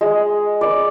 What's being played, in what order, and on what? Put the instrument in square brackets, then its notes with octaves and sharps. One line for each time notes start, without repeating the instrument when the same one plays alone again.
[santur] G#3
D5